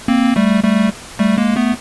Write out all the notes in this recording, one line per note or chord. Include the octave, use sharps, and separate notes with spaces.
A#3 C4
G3 A3
G3 A3
G3 A3
G#3 A#3
A3 B3